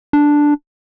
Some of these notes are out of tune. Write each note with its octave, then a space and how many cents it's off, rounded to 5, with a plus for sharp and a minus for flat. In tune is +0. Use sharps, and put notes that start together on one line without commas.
D4 +0